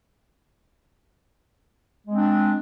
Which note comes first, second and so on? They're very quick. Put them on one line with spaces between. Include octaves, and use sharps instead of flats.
G#3 C4 D4